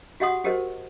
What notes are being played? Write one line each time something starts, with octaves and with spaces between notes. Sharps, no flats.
F#4 G4 D#5 F#5 C6 D#6
F#4 G4 A#4 C5 D#5